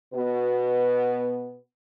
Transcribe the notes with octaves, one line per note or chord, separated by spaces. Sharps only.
B2 B3 B4